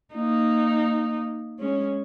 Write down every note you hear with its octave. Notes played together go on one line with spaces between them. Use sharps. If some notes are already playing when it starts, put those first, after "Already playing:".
A#3 D#4
G#3 C#4